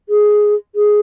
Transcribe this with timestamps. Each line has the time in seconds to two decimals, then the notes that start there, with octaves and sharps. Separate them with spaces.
0.09 G#4
0.75 G#4